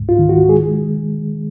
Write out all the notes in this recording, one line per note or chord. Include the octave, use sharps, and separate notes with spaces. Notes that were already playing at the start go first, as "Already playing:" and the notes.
Already playing: C#2 G#2
F4
D#3
F#4
G#3 G#4